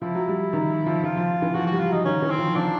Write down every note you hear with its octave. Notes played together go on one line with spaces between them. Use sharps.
F3 E4
F#3
G3
D#3
F3
F3 F4
F3
E3
F3 F#4
F#4
G3
F4
F#3 D#4
D#3 C#4
E3
C4
F3
F3 D4